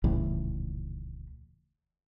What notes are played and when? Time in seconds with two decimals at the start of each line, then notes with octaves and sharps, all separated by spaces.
0.04 D#1 C#2 A2 E3